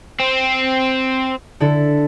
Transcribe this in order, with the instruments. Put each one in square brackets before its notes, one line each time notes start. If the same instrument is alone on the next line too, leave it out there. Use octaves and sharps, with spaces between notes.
[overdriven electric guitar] C4
[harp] D3 E4 A4